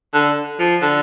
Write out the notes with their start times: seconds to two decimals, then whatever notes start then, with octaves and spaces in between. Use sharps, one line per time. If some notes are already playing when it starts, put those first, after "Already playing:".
0.14 D3
0.59 F3
0.82 D3